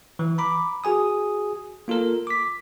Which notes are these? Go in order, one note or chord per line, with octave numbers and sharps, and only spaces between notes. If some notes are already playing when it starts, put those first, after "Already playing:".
E3
A#5 B5 D6
F#4 G#4 G#5 D#6
A#3 F4 A4 A#4
D6 B6